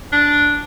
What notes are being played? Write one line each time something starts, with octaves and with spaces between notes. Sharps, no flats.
D4